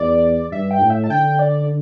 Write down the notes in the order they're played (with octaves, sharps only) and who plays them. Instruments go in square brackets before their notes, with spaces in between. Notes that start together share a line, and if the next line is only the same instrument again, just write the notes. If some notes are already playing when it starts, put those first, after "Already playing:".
Already playing: [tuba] E2 [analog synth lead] D5
[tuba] G2 [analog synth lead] E5
[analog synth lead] G5
[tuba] A2
[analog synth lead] E5
A5
[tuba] D3 [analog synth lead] G5
[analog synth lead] D5